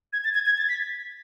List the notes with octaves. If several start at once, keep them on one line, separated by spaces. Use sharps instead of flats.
G#6
A6
G#6
G#6
A6
B6